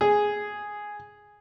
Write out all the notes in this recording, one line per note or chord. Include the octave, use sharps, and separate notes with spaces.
G#4